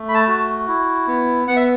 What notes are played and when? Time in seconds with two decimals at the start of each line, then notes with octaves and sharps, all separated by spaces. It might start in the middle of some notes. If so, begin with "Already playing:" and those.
Already playing: A3
0.09 B5
0.14 A5
0.28 F#4
0.68 E4
1.07 B3
1.47 B3 F#5
1.56 E5